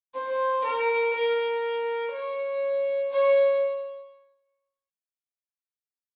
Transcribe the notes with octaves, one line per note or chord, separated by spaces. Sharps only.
C5
A#4
A#4
C#5
C#5